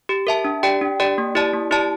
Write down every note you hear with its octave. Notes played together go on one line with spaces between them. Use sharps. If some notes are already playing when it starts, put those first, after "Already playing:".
G4
A#4 E5 A5
D4
G4 D5 G5
D4
G4 D5 G5
A#3
E4 G4 D5 A5
A#3
E4 G4 D5 A5